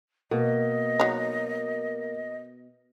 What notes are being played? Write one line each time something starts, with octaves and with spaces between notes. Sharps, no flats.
B2 A#3 D#5
F#3 D#4